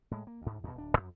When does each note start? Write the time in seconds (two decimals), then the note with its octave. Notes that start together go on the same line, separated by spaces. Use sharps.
0.11 A2 G#3
0.27 A#3
0.42 D2 G#2
0.63 E2 G2 B2
0.75 D1 D4
0.97 F2